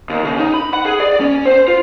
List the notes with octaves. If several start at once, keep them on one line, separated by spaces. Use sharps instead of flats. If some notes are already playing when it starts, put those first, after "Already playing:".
D#2
C#3
D#4
B5
F#5
G#4
D5
C#4
C5
F4